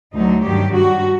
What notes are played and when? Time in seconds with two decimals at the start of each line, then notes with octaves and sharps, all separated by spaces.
0.14 D2 D3 F#3 D#4
0.43 G2 D#3 F#3 G4
0.72 G2 F#3 F#4